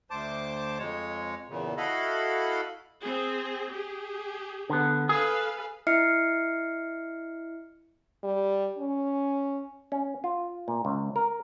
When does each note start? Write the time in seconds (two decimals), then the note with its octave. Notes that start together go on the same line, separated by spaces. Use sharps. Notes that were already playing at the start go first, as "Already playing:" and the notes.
0.11 D2 C5 A5 D6
0.79 F2 G#3 C#5
1.49 E2 A#2 C#3
1.77 E4 F#4 A4 D#5 F5 B5
3.02 C4 G#4
3.72 G4 G#4
4.70 D3 B3
5.09 G#4 A4 B4 F5
5.87 E4 D#5 E5 F6 C7 C#7
8.23 G3
8.78 C#4
9.92 C#4
10.24 F4
10.68 A#2
10.85 C#2
11.16 A#4